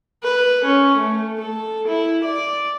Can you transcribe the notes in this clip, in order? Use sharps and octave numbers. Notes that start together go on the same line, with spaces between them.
B4
C#4
A3
A4
E4
D5